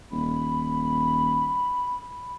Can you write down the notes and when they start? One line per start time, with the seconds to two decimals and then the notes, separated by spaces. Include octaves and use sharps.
0.11 D#1 B5